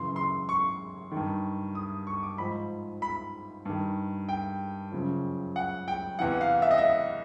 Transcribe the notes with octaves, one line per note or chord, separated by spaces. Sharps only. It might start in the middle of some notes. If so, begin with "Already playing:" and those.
Already playing: F#2 C#3 E3 C6
C6
C#6
G2 D#3
D#6
C#6
D6
G#2 F3 B5
B5
G2 D#3
G5
F#2 C#3 F3
F#5
G5
E2 C3 E3 F#5
F5
E5
D#5
E5